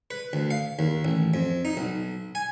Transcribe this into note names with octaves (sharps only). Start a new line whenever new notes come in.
B4
D2
F5
D#2
A1
F2
D#4
B1
G#5